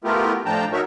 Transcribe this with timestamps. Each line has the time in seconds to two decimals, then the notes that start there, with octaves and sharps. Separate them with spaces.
0.04 A3 B3 E4 F4 G4 A#4
0.46 A2 F3 D4 G5 A5 A#5
0.72 D#4 F#4 A#4 C#5 E5